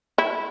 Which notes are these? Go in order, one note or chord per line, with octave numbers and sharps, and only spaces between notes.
E4